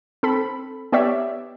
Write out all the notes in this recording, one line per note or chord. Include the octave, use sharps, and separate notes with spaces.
C4 A4 B5
B3 G4 C#5 D5 E5